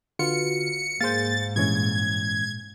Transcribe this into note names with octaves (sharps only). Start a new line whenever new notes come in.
D3 F4 F#4 B4 F6 C#7
G#2 A#3 G#4 C5 F5 G6 A6
G2 A#2 E3 G#3 C#4 G#6